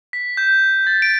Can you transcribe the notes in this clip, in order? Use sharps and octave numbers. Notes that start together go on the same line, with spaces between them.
B6
G6
A6
D7